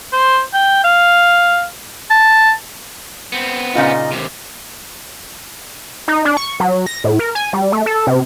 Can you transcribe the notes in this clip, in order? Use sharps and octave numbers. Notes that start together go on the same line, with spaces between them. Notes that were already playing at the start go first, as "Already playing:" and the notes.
C5
G5
F5
A5
B3 C4
A#2 C#3 D#4 F4 D#5
D#2 C3
D#4
D4
C#6
F#3
A#6
A2
A#4
G#5
G3
A3
A4
C3